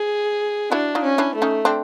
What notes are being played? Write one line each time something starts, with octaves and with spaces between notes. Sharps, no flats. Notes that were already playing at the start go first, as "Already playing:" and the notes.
Already playing: G#4
D4 E4 F#4
D#4 F4
C#4
D4 E4
A3
C#4 D#4
C4 D4